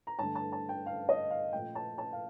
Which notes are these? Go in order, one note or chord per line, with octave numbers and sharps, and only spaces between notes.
A#5
G2 D3 A3 A5
A5
A5
G5
F5
D#5
F5
A#2 F3 A3 G5
A5
A5
F5